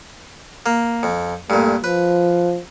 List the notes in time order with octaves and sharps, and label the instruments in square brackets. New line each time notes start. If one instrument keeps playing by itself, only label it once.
[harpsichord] A#3
F2
[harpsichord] G2 A#2 [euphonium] A3
[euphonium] F3 [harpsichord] B4